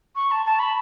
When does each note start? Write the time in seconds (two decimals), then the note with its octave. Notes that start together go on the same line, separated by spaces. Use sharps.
0.15 C#6
0.31 A5
0.45 A5
0.59 B5